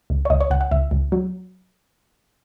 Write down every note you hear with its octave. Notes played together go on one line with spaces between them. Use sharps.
C#2
C#5
C#2 D#5
C#5
C#2 F#5
F#5
C#2 E5
C#2
F#3